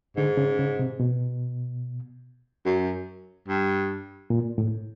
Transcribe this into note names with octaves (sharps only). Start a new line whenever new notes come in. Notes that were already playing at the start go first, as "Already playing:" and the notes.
G#2 D3
C#3
C#3
C3
B2
F#2
G2
A#2
A2